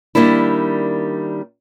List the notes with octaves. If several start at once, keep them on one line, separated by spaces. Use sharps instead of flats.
D#3 G3 A#3 D4 E4